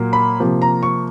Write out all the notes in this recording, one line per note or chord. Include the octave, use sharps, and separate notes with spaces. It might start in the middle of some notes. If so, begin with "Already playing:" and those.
Already playing: A#2 F#3 A#3
B5
C3 F3 A#3
A#5
C#6